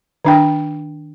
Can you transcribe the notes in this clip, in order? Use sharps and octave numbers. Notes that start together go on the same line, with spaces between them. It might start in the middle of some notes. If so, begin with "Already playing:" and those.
D#3 D4 G5